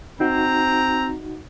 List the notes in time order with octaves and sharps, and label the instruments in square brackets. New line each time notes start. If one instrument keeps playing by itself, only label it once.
[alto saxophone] C4 [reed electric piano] D#4 F#4 [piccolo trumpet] A#5